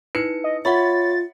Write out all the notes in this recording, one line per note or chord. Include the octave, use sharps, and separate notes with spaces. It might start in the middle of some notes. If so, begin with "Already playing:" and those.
D#4 E4 B4 C#7
D#5
F4 C#5 E5 F#5 B5 A6